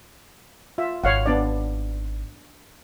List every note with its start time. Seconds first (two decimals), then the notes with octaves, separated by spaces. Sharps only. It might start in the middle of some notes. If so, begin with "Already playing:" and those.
0.78 F4 E5
1.04 G#1 C#5 F5 F#5
1.26 B3 D4 D5